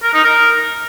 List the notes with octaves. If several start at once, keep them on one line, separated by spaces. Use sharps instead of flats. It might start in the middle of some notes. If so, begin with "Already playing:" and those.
A#4
D#4
A#4